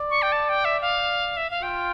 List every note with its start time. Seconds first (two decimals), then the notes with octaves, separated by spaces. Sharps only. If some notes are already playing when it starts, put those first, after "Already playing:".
Already playing: D5
0.10 C#6
0.22 G5
0.32 A5
0.49 G5
0.65 E5
0.81 F5
1.37 E5
1.50 F5
1.63 F4 G5